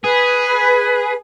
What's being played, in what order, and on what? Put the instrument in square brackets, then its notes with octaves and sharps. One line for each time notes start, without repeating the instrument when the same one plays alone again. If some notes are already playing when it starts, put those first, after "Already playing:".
[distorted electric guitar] G#4 [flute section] B4